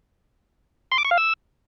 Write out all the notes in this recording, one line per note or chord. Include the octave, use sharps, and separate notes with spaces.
C6
D6
C#6
F5
E6